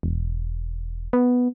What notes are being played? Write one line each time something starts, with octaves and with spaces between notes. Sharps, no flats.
E1
B3